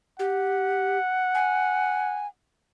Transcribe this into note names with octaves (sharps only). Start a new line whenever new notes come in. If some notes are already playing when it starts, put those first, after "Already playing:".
G4 F#5
G#5